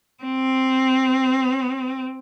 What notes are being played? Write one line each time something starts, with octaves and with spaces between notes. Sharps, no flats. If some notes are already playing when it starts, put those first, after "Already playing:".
C4